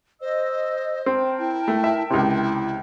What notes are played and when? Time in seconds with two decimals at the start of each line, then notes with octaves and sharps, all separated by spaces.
0.21 C5 D#5 E6
1.06 C4 A#4 G5 A5
1.39 E4
1.68 A3
1.84 E5
2.10 C#2 C3 E4